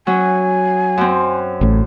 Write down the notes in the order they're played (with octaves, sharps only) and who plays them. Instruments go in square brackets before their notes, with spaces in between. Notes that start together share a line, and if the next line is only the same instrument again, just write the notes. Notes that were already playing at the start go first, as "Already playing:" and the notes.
[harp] F#3 C#4 [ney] G#5
[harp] F#2 C4
[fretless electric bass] A1 A2